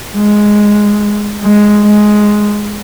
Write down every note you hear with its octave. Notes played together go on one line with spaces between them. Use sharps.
G#3
G#3
G#3